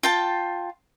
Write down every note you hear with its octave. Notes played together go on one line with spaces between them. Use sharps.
F4 G5 A5